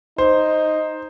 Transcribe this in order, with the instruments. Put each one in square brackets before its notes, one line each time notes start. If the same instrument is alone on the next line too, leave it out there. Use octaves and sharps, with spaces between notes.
[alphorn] D#4 [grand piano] C5